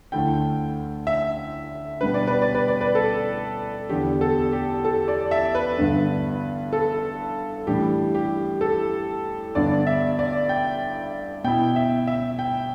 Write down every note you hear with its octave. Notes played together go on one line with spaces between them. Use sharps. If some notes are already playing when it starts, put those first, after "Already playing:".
D2 D3 A3 E4 G5
E5
B2 G3 D4 B4
D5
B4
D5
B4
D5
B4
A4
E2 D3 B3 D4 G4
A4
G4
A4
D5
E5
B4
G2 D3 B3 D4
A4
A2 E3 G3 D4 G4
G4
A4
G2 D3 B3 D4 D5
E5
D5
G5
B2 B3 E4 G5
E5
E5
G5